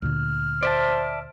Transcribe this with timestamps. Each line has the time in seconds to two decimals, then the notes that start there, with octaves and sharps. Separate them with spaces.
0.02 D2 A#2 D3 F6
0.63 C5 D5 E5 A5